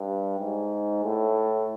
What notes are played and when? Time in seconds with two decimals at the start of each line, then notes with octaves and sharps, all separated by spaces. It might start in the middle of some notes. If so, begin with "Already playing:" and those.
Already playing: G2
0.39 G#2
1.04 A2